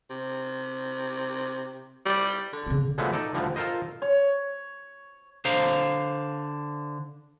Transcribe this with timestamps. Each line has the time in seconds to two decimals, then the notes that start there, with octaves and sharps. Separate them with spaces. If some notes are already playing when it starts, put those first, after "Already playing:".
0.10 C3
2.05 G3
2.53 D3
2.67 C#3 C4
2.98 D3 F3 F#3 G#3 A3 B3
3.13 D#4 A4 D5
3.34 D2 D3 F3 G3
3.56 F4 A4 A#4 C5 D#5
4.02 C#5
5.45 D3 C5 F5 A#5